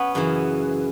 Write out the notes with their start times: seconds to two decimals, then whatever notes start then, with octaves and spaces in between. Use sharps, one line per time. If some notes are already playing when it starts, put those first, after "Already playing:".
Already playing: B3 C#4
0.15 F#2 C#3 E3